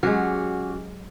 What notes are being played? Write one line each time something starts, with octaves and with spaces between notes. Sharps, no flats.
F#3 G#3 C#4 F#4 G4 F6